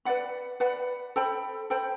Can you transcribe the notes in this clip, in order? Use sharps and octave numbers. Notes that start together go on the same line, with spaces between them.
B4 D5 F#5 B5
B4 D5 F#5 B5
A4 C5 G5 B5
A4 C5 G5 B5